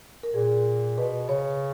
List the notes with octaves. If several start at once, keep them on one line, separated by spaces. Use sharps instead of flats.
A#4
A#2 G#4
B2 B4
C#3 C#5